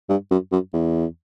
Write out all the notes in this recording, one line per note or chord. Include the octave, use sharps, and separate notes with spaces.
G2
F#2
F#2
E2